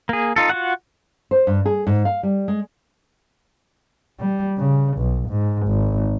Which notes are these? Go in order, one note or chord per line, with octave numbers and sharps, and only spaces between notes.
A#3 G#4
D#4 F4 A4
F4 F#4 F#5
C5
G2
G#4
G#2
F5
G3
G#3
G3
C#3
B1
G#2
G#1